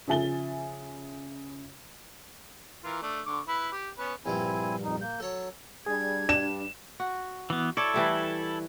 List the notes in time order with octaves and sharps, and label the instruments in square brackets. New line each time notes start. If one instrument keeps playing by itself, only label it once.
[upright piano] C#3 F3 E5 G#5 A6 G7
[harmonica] E3 F4 A#4
A3 D4
D3 C#6 D6
E4 B4
G4
B3 C#4 B4
[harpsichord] A#1 G2 G3 [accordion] C4 E4 G#5
[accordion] F2 D#4
A#3 G6
[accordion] F#3 [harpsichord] A4 C#5
[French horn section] G3 D4 [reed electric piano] G#4 [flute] G#6
[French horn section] G2 G3 [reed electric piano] D4 [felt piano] E7
[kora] F#4
[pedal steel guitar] E3 B3
[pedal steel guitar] E4 A4 [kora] C#5 D5
[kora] E3 G3 A3